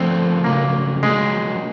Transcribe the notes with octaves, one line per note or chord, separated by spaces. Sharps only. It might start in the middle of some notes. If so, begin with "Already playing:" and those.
Already playing: F3 A3 C4 D4 F4
C#3 F#3 A3 A#3
F#3 G#3 A#3 D4